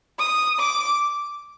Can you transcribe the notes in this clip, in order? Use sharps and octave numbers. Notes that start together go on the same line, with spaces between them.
D#6
D6